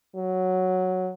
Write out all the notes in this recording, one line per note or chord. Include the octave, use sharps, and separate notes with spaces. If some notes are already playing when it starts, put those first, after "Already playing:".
F#3